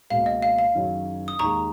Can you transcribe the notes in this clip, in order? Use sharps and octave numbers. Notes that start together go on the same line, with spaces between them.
C#2 B2 A#3 F5
D#5
F5
F5
F#1 F#2 D#3 F#3 C#4
D#6
D#2 D#3 G#3 A#5 C#6